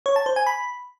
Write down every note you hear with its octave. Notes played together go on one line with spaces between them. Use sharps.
C#5
A5
C5
G#5
B5